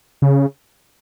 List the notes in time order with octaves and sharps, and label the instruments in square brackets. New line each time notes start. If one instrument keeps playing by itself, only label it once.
[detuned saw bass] C#3